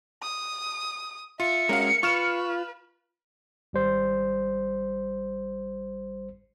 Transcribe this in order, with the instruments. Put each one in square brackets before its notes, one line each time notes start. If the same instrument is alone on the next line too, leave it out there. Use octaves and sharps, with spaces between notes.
[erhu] D#6
[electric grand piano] F4 [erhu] E5 [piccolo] C#7
[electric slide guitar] G#3 C#4 F#4 [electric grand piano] A#4 F5
[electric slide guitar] F4 [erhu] B4 [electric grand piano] C#6 F6 E7
[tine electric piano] G#1 G3 C5